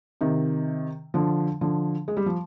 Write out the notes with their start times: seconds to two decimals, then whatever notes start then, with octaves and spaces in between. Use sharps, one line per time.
0.21 C3 D#3
1.14 D3 F3
1.61 D3 F3
2.08 G#3
2.17 G3
2.26 F3